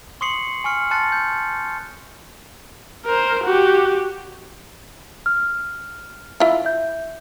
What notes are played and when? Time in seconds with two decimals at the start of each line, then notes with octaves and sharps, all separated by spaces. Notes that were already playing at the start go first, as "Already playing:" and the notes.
0.21 C6 C#6 D#6 C7 C#7 F#7
0.64 G#5 C#6 F6 C#7
0.91 A5 C6 F#6 A6 C#7
1.12 G6
3.06 A#4 C5
3.44 F#4 G4
5.26 F6
6.40 E4 F4
6.65 E5 G6